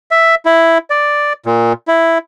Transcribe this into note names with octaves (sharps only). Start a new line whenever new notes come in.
E5
E4
D5
A#2
E4